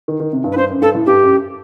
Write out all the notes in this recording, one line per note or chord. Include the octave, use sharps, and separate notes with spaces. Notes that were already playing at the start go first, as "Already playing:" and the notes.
D#3
D#3
C3
G2
B4
G2 C5
F#2
G2 A4
A2
G2 G4
F#2